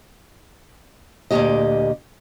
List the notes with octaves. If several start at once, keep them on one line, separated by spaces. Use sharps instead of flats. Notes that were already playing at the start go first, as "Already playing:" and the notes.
D2 A#2 F3 G#3 G4 D#5